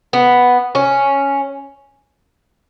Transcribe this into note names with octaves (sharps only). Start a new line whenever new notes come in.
B3
C#4